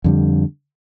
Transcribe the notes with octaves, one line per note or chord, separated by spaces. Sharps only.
F2 D3 G3